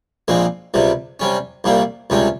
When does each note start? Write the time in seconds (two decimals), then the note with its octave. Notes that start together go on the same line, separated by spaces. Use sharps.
0.28 A#1 A#2 G#3 C4
0.74 C#2 C3 G3
1.20 C3 G3 C#4
1.64 C2 A#2 G3 A#3
2.10 C#2 C3 G3 C#4